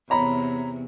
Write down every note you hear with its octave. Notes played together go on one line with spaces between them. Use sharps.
E2 C3 C#5 A#5 B5